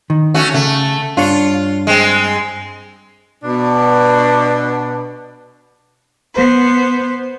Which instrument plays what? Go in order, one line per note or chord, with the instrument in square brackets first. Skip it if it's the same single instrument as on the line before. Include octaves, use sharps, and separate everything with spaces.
[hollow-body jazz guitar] D#3
[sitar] A3 C#4 F#4
[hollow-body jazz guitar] C#3 [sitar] A3
[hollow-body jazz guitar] G2 D4 C#5 [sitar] F4
[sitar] G#3 C4
[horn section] B2 D4
[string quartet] B3 C5